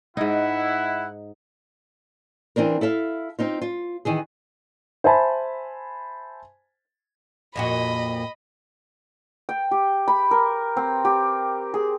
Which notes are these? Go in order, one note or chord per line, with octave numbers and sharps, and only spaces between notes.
G#2 D#4 E4 F#5
E3 C4 D4 A#4
E4 A4 E5 F5
C4 D#4 F4
F4
D#3 E3 G#4
C5 E5 G#5 A5 B5
F2 A#2 F#4 D#5 B5
G5
G4
B5
A#4
C4
G4
G#4